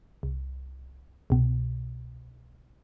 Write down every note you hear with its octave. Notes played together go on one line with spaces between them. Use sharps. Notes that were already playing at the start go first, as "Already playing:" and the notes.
C2
C2 B2